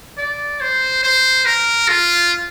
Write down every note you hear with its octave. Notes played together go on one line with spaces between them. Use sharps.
D5
C5
C5
A#4
F4